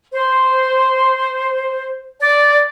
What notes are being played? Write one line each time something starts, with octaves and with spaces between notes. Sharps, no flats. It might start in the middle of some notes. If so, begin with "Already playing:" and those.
C5
D5